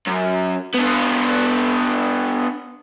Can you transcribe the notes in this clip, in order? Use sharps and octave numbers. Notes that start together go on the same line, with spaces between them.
F#2
B3 D4